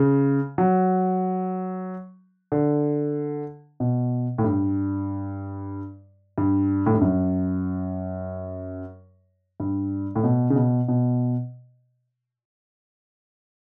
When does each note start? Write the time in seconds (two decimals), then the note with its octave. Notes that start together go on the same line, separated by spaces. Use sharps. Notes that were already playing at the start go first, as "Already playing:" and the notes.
Already playing: C#3
0.58 F#3
2.52 D3
3.80 B2
4.38 A2
4.44 G2
6.38 G2
6.86 A2
6.94 G2
7.01 F#2
9.60 G2
10.16 A2
10.24 B2
10.50 C#3
10.56 B2
10.88 B2